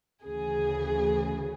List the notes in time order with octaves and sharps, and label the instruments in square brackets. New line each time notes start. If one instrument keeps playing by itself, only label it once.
[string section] D2 C#3 E3 G#4